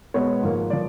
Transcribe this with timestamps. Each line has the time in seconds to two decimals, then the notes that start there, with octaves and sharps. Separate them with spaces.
0.14 B2 G#3 B3 C#5
0.42 G#2 F3 A#3
0.70 F3 D5